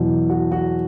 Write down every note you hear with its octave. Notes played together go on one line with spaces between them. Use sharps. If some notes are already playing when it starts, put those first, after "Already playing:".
Already playing: E2 B2 F#3
F#4
F#4